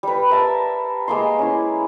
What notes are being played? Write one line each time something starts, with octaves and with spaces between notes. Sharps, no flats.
G3 B4
A#4 E5 A5
G#3 A#3 C6
C#4 E4